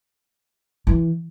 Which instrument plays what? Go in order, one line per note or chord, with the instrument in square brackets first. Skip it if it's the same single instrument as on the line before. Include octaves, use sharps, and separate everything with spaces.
[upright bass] E3